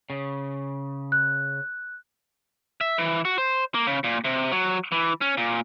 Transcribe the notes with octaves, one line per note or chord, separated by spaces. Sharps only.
C#3
F#6
E5
E3
F#4
C5
A#3
C#3
A#2
C3
F#3
E3
C#4
A#2